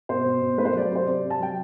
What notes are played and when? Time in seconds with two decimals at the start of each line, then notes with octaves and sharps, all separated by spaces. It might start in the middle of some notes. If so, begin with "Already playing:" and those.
0.09 B2 C5
0.26 B2
0.41 B2
0.58 A3 B4
0.65 C5
0.73 F#3 B4 D5
0.82 C5
0.90 C3
0.96 C5
1.07 C3 D5
1.24 C3
1.30 A5
1.40 F#3 G5